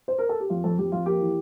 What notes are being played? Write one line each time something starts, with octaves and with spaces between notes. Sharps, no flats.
C5
A#4
A4
G4
F2 F4
F2 A4
F2 G4
F2 F4
A#3 G4
E3